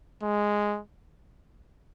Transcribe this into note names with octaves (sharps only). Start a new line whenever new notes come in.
G#3